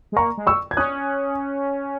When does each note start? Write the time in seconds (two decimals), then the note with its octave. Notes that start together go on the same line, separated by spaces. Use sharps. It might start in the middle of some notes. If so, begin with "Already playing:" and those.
0.12 G#3
0.16 A#3 A#5 C#6
0.37 G#3
0.47 C#6 E6
0.71 G#6
0.77 C#4 D#6 F#6